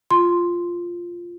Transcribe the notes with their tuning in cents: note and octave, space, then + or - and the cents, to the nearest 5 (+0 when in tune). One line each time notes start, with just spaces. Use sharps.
F4 +0 C6 +0